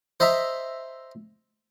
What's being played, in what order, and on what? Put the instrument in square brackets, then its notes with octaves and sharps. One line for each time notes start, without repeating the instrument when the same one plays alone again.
[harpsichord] C5 D#5 E5 A#5